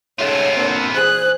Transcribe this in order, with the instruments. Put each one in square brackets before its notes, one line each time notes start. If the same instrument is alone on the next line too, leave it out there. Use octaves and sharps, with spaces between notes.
[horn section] G#2 C#3 A3 [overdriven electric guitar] B3 F4 [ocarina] C#5
[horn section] D3 A#3 C4
[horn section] A#2 E3 G#4 [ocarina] C5 [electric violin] F#6